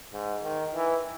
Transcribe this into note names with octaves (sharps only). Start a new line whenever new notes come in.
G#2
D#3
E3